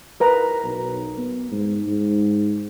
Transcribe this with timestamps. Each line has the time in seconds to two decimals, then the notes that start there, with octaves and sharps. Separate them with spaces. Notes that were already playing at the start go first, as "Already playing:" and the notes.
0.20 A#4 B4 A#5
0.63 B1
1.18 B3
1.51 G#2
1.87 G#2